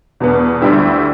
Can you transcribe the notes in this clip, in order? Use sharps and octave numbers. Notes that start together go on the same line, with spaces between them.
E2 B2 B3
D2 D3 G3 E4 G4